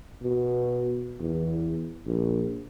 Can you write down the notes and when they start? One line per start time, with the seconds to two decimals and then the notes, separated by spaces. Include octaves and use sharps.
0.22 B2
1.20 E2
2.06 A#1